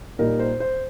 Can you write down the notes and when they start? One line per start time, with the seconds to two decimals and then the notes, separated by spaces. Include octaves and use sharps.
0.19 A#2 G3 D#4 A#4
0.39 C5
0.60 C5